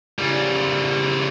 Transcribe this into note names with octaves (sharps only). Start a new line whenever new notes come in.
C#3 G3